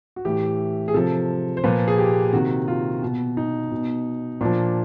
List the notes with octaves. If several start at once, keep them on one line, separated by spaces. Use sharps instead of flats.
F#4
A2 E3 G4
G#4
C3 F3 A4
C5
A#2 F3 B4
G#4
G4
C3 D#3 F#4
F4
B2
D#4
B2
A#2 F3 D4